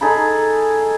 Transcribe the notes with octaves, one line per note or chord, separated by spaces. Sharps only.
D#4 G#4 A4 B5